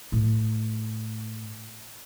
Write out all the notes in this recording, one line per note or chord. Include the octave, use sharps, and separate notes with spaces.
A2